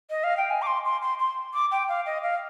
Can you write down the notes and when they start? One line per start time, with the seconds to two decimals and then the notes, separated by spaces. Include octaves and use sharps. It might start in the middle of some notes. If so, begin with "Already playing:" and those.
0.10 D#5
0.24 F5
0.37 G5
0.50 G#5
0.62 D6
0.67 C6
0.85 C6
1.02 C6
1.19 C6
1.54 D6
1.71 G5
1.89 F5
2.06 D#5
2.23 F5